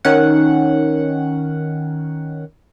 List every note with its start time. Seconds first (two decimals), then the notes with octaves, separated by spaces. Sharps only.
0.05 D#3 C#4 F#5